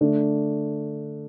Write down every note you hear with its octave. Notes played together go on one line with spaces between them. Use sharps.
D3 A3 D4